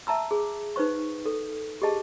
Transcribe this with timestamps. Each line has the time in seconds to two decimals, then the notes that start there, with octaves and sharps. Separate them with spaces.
0.07 E5 A5 A#5 E6
0.31 G#4
0.76 D#4 B4 C5 C#6
1.26 A4
1.82 G4 G#4 D#5 A5